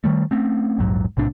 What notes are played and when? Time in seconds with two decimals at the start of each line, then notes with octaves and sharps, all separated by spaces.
0.04 D#3 G3 A3
0.31 A3 C4 C#4
0.79 A#1 E2 G#2 F#3
1.17 B1 A2 C3 D4